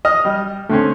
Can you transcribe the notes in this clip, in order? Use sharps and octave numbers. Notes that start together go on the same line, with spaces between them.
D#5 D#6 F6
G3
D3 A3 C4 C#4